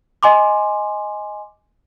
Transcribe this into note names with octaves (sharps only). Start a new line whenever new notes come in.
D#5 G#5 C6 D6